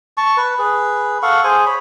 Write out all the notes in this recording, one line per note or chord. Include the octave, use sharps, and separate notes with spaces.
A5 C#6
B4
G#4 B4
A4 F5 F#5 C#6
G#4 C5 G#5
C#5 B5